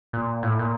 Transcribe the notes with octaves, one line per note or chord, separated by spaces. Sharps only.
A#2
A2
A#2